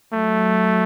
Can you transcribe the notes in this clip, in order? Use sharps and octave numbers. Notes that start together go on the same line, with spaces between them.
F#3 A3